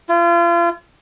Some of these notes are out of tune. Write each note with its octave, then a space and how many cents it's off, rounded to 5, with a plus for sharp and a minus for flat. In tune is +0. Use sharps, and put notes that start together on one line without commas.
F4 -35